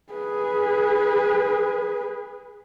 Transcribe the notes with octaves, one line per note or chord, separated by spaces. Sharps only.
G#4 B4